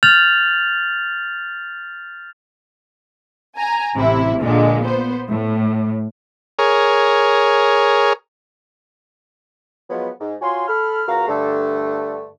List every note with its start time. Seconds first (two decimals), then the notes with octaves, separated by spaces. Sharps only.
0.03 F6 G6 A6 F7 F#7
3.58 G#5 A#5
3.95 A1 C3 E4
4.42 A#1 A#2 D3 G#3
4.84 B3 C5
5.29 A2
6.59 G#4 A#4 C#5
9.90 F3 F#3 G#3 B3
10.20 G#2
10.41 F4 F#4 C#5 G#5 C6
10.68 A4 B5 F6
11.07 C#2 F#4 A#4 F5 A#5
11.28 G2 D3 A3